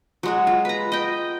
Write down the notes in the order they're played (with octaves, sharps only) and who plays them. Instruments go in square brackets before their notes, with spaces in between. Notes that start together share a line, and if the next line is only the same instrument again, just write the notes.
[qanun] F#3 G#3 F#4
F4
B4 A#5
D#5 G5